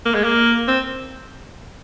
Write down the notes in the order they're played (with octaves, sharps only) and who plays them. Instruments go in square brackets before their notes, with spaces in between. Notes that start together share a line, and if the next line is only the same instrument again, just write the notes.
[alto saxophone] A#3
G#3
A#3
C4